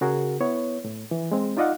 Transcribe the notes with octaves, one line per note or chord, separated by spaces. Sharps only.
C#3 F#4 G#4 A#4
B3 E4 C#5
A2
E3
G#3 C4
D#4 F4 D5 D#5 F5 F#5